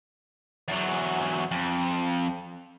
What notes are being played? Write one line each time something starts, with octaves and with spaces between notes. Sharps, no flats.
E2 F#3
F2